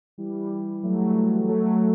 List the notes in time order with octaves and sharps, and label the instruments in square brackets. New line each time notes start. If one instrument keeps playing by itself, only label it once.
[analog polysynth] E3 G3
F#3 A3
F#3 A3